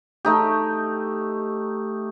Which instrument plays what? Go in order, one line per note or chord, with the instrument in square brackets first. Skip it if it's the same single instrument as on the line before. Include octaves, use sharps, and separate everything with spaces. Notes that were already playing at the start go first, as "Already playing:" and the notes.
[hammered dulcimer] A3 D#4 G4